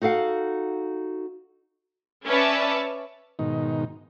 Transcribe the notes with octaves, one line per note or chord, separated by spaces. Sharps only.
D#4 F#4 A4 F5 F#5
C#4 B4 C#5 D5 E5 A5
G#2 B2 D#3 D#4